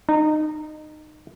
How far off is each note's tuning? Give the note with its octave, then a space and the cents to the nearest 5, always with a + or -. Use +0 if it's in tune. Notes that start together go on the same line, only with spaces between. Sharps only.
D#4 -25